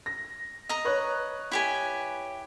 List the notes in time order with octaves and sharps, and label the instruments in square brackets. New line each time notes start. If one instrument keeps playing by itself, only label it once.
[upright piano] A#6
[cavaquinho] D#5 A#5
[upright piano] B4 C#5 F#6
[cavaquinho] E4 G4 G#5